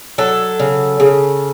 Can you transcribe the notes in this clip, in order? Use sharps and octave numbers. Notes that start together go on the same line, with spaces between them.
F#3 A4
C#3
C#3